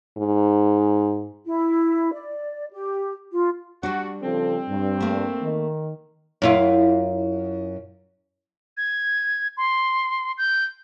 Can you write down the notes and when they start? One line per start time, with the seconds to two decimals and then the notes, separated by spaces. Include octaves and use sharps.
0.18 G#2
1.47 E4
2.13 D5
2.72 G4
3.33 F4
3.83 G3 D4 F#4
4.23 C#3 F3 C4 A4
4.68 G2
5.00 A3 A#3
5.41 D#3
6.42 F#2 E4 F4
8.77 G#6
9.57 C6
10.38 G6